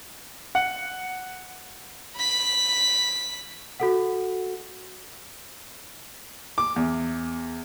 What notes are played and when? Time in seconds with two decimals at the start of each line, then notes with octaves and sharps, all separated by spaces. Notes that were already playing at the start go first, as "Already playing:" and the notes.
0.55 F#5
2.16 B5 B6
3.80 F#4 A4 F#5
6.58 D6
6.76 E2